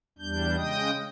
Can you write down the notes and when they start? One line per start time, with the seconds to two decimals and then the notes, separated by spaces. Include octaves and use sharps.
0.18 E2 G3 D4 G6
0.57 C#3 G#3 D#5 G5 D#6